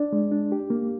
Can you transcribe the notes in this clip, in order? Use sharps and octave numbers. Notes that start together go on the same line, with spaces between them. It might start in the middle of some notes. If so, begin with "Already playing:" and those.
Already playing: D4 D5
G#3
D4
G4
A#3